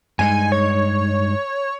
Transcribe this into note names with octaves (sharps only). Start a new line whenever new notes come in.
G2 G#3 D#4 G#5
C#5